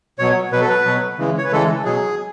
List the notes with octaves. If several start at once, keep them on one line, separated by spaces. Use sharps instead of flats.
B2 F#3 C#5
B2 F#3 B4
A4
B4
B2 F#3
C#3 E3 G#3
C#5
B4
C#3 E3 G#3 A4
B2 F#3 G#4